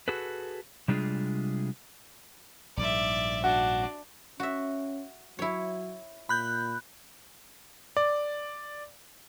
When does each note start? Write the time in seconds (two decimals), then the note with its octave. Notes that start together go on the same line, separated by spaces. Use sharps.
0.08 F#4 G#4 A4 B4
0.88 C3 G3 G#3 D4 F4 G#4
2.77 A#1 G#2 G3 D5 E5
3.44 D4 F#4
4.40 C#4 F#4 E5
5.39 F#3 E4 C#5
6.29 A#2 B5 F#6 G6
7.97 D5